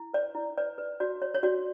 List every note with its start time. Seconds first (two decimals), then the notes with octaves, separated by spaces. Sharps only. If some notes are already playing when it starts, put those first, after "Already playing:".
Already playing: E4
0.14 B4 D5
0.35 E4
0.57 B4 D5
0.78 B4
1.00 F#4 D5
1.22 C#5
1.35 C#5
1.43 F#4 D5